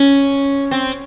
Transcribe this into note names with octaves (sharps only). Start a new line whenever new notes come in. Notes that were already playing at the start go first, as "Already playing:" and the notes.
Already playing: C#4
C4